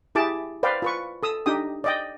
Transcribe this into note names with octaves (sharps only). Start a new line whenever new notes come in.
E4 G4 G#4 A5 D6
B4 C5 D5 F5 G5
F4 B4 C#6
A4 D#6 E6
D4 D#4 G4 G5 D#6
D5 D#5 G5